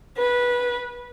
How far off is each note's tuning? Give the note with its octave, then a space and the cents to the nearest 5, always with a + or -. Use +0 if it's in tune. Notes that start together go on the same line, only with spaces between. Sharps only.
B4 -15